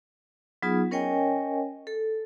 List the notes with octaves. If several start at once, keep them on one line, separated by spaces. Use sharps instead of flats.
F#3 B3 D#4 F4 G#4
C#4 A#4 C#5 D#5 G5 G#5
A4